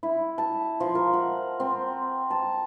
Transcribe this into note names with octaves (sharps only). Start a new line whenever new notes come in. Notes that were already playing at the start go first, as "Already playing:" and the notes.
E4
A5
F3
A#4
F#5
C4
A5